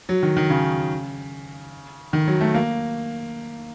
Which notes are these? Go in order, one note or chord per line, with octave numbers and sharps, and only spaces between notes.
F#3
D#3
D#3
C#3
D#3
F#3
A3
A#3